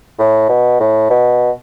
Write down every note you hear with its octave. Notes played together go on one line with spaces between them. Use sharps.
A2
B2
A2
B2